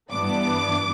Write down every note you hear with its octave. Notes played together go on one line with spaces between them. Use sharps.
G2 E3 B3 D4 D6